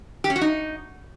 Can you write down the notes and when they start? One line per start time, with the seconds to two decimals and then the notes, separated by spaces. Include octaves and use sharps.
0.24 G4
0.30 C#4
0.36 F#4
0.41 D#4